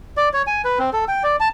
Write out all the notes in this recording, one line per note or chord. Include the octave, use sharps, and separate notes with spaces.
D5
C#5
G#5
B4
C4
A4
G5
D5
A5